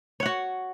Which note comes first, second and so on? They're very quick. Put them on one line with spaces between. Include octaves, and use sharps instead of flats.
C#5 F#5 F#4